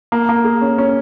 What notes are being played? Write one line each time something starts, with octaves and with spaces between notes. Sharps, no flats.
A#3
A#3
G#4
C#4
C#4